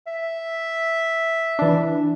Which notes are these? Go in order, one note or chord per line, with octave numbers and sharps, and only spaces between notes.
E5
E3 D4